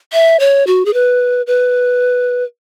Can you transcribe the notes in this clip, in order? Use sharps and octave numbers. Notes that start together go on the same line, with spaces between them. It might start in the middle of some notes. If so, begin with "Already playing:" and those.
E5
C#5
F#4
G#4
B4
B4